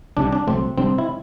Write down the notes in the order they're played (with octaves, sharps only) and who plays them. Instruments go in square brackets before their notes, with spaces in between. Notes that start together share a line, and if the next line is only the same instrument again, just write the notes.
[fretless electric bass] C2 C3 G3 [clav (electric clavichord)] D4
[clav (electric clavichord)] D4
[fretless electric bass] C2 C3 F#3 A3 [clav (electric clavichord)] C4
[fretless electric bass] C3 G3 D4 [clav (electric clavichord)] C4
[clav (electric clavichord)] E4